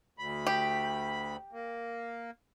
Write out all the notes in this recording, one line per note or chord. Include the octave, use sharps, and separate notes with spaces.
D2 B5
G4
A#3